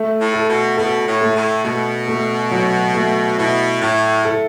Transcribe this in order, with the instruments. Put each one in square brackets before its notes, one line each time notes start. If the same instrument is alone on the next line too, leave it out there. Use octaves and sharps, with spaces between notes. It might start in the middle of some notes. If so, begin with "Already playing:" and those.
Already playing: [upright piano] A3
[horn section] A2
[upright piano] A4
[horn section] B2
[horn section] B2 [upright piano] A4
[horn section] A2
[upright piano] A3
[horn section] A2
[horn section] B2 [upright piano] A3
[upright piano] A3
F#3
A3
[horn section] B2 [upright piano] E4
[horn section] A2 [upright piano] E4
[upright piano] A4